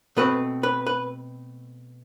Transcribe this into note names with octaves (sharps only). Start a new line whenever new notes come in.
B2 A3 C4 B4
B4
B4